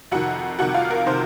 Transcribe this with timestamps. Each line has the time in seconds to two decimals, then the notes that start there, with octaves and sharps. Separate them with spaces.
0.11 F2 C3 D#3 F#4 F#5
0.59 F2 C3 D#3 F#4 F#5
0.74 F4 F5
0.91 A#4
1.06 C3 D#3 C5